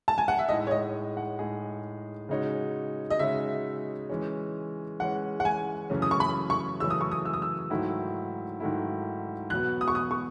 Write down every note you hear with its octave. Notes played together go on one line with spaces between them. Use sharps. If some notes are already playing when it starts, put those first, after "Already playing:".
A5
G#5
F#5
E5
A2 G#3 D#4 G#4 D#5
C#5
D#5
F#5
A2 G#3 D#4 G#4
C#3 G#3 D#4 F#4 C#5
D#5
C#3 G#3 D#4 F#4 C#5 E5
E3 G#3 C#4
E3 G#3 C#4 F#5
F#5
G#5
F#2 C#3 E3 A3 C#4
D#6
C#6
B5
C#6
F#2 C#3 E3 A3 C#4 E6
D#6
C#6
D#6
E6
D#6
E6
G#2 D#3 F#3 A3 E4
G#2 D#3 F#3 A3 E4
E2 B2 F#3 B3 F#6
D#6
C#6
D#6
C#6